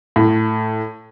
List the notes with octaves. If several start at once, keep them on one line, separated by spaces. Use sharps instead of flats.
A2